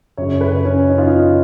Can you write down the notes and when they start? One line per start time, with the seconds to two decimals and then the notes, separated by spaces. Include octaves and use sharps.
0.17 F#2 C#3 F#3 C#5
0.41 B4
0.65 C#4
0.88 D#4
0.98 F4
1.07 D#4